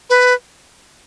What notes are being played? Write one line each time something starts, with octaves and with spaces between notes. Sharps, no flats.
B4